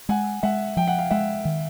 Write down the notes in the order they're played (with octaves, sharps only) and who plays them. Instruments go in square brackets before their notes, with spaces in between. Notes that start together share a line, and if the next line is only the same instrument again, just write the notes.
[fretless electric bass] G#3 [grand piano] F#5 G#5
[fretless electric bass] G#3 [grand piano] E5 F#5
[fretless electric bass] F3 [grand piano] G5
[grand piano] F#5
F5
[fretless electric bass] G#3 [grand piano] E5 F#5
[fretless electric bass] D#3